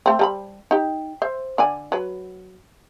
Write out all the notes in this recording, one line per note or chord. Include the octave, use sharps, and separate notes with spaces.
A3 C4
G3 A4 B5
D#4 G4
C5 E5
D3 D5 G#5
F#3 B4